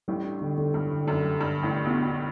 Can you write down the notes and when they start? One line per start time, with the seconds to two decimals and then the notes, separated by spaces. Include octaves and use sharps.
0.08 A1 A2 G3
0.24 D4
0.41 D3
0.58 D3
0.74 G2 D3
0.91 D3
1.07 F#2 D3
1.24 G3
1.41 G2 D3
1.57 D3
1.63 A1 A2
1.74 D3
1.85 B1 B2
1.90 D4
2.07 B2 D4